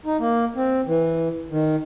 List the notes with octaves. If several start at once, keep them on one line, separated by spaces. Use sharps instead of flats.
D#4
A#3
C4
E3
D#3